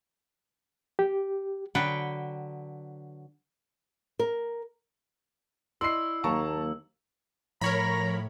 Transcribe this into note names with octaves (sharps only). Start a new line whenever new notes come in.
G4
D3 F#3 B4 F#5 G5
A#4
E4 D5 D#5 C6 E6 C7
D#2 F#3 A#3 A5 A#5 C#6
A2 F3 A#4 C#5 A#5 B5